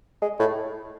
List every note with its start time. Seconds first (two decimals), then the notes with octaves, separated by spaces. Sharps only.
0.22 G#3
0.40 A2